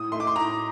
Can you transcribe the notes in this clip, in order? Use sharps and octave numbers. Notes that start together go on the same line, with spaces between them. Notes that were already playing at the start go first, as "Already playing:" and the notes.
Already playing: A2 D#6
A3 D#4 C6
D6
C6
A2 A#5